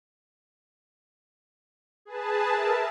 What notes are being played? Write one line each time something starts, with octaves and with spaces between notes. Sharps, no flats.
G#4 B4 A5
A#4 E5 A5